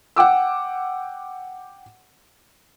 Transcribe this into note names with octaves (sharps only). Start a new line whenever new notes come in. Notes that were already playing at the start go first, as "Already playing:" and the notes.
F#5 G5 D6 E6